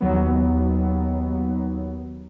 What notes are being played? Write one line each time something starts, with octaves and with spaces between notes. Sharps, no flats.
D#2 F#3 B3